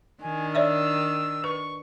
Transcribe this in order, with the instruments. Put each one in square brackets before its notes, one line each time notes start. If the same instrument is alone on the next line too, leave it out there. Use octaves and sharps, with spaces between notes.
[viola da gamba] D#3 D4 [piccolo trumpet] G#5
[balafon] C#5 D5 E5 [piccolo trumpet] E6
[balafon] B4 [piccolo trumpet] C#6